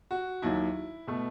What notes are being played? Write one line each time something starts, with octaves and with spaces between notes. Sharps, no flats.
F#4
D#2 D#3 F#3 E4
B2 A3